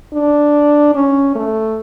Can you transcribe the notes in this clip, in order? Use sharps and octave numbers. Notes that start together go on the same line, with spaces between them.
D4
C#4
A3